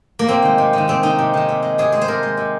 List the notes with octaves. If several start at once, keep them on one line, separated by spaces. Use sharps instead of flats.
A#3
C3 C4
D#3 G#3
C3
D#3 G#3
C3 C4
D#3 G#3 D#4
C3
D#3 G#3
C3
G#3
C3 G#4
G#3 G#4
C5
C3 A#4
G#3
C3